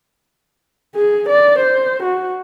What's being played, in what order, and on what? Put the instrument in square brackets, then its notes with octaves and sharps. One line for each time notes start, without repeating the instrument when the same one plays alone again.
[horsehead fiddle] G#4
D5
C5
F#4